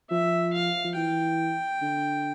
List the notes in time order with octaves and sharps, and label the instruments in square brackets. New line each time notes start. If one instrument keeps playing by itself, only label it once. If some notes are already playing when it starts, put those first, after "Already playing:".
[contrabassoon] F3 [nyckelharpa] E5
[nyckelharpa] F5
[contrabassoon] F3
[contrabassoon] E3 [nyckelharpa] G5
[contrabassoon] D3